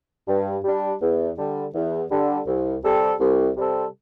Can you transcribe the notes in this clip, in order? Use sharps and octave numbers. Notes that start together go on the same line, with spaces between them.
G2
G3 D4
E2
D3 G3
E2
D3 G3
C2
C3 G3 C4 A4
C2
C3 G3 C4 A4